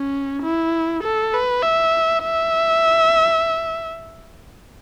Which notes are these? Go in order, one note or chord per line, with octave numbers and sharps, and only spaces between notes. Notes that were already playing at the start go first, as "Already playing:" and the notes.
Already playing: C#4
E4
A4
B4
E5
E5